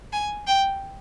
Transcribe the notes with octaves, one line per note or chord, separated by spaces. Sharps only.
G#5
G5